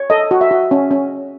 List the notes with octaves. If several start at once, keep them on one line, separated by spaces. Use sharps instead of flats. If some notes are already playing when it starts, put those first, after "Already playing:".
Already playing: C#5
A4 D#5
F#4
E5
F#4
C#4
C#4